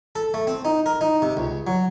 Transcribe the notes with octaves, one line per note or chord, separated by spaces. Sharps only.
A4
A3
C4
D#4
A#4
D#4
C3
C#2
F#3